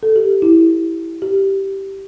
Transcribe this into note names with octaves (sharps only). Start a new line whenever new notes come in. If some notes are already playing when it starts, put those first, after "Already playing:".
A4
G4
E4
G4